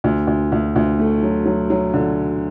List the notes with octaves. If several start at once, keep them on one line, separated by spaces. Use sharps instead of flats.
D2
D2
D2
D2
A3
F#3
F#3
F#3
D3